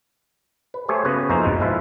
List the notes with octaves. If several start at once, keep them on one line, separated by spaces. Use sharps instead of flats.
B4
A3 G4 G#4 C5 C#5
C#3 B3 F#4 C#5
F2 A#3 D#4 G#4 C5 E5
G1 D2 B2 B4
F3 G#3 E4 F4 B4